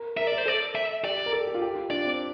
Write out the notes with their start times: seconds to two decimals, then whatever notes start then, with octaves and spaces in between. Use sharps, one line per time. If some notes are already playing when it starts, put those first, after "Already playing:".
Already playing: A#4
0.17 A#4 E5
0.27 D5
0.32 A#4
0.38 C5
0.46 A4 D5
0.75 E5
1.04 G4 D5
1.26 A#4
1.33 A4
1.47 G4
1.54 F4
1.62 G4
1.76 F4
1.90 D4 D5
2.05 C4